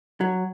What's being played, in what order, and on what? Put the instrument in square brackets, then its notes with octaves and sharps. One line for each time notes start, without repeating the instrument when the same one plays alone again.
[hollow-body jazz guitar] F#3